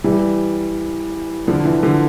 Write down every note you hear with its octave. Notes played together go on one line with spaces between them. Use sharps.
E3 G3
D3 F3
E3
D3 F3